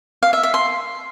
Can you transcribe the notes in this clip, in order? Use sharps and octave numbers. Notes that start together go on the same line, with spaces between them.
F5
E5
E5
C6